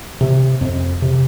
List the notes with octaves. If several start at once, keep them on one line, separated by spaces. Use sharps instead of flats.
C3
F2
C3